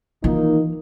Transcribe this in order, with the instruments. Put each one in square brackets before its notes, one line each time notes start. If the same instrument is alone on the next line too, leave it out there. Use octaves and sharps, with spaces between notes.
[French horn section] D#3 A#3 D#4 [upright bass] E3 F4